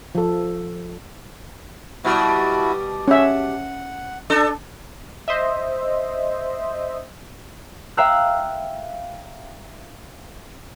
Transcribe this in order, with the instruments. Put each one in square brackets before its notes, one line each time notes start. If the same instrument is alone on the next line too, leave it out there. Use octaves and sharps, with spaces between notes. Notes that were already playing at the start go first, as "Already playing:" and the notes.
[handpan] F3 A4
[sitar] B2 G3 [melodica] E4 F#4
[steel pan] C#4 E5 [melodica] F#5
[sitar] D4 A4
[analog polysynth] C5 D#5 E5
[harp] E5 F5 G5 A#5 E6 F#6